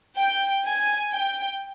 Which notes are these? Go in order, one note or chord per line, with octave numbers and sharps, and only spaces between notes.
G5
G#5
G5